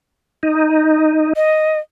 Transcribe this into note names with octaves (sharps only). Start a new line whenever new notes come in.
D#4
D#5